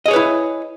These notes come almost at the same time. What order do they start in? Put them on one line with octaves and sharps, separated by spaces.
D#5 G#4 C#5 B4 E4